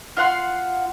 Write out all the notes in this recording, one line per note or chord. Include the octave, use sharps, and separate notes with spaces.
F4 F5 F#5 C6